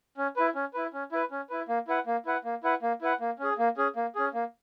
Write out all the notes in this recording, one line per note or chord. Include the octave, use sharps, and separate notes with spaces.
C#4
E4 B4
C#4
E4 B4
C#4
E4 B4
C#4
E4 B4
A#3
E4 B4 F#5
A#3
E4 B4 F#5
A#3
E4 B4 F#5
A#3
E4 B4 F#5
A#3
C#4 G#4
A#3
C#4 G#4
A#3
C#4 G#4
A#3